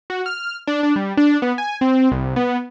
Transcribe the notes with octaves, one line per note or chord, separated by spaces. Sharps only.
F#4
F6
D4
D4
G3
D4
B3
G#5
C4
C2
B3